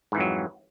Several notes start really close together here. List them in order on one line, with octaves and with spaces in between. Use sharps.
G#2 E3 F2 F#3